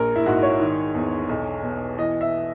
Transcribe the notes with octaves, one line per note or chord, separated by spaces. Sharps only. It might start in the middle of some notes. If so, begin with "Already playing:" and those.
Already playing: A#1 A#4
E4
G#2 F#4
C#5
D#3
E2
B1
B2
E3 D#5
E5